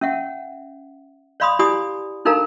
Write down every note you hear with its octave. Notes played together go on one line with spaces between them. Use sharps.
C#4 E5 F#5
C#5 D5 F5 B5 C6 D#6
E4 G4 D5 G#5 B5 D#6
D4 D#4 A4 A#4 F5 A#5